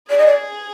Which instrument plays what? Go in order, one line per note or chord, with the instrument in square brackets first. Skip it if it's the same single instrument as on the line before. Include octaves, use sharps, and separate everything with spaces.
[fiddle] G#4 [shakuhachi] D5
[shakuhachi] D#5
D5